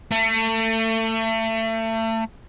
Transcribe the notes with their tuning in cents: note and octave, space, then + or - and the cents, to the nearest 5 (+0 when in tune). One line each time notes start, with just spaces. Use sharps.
A3 +30